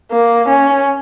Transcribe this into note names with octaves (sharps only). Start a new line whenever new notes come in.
A#3
C#4